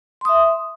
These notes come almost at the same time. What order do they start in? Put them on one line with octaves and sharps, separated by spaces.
C6 D#6 E5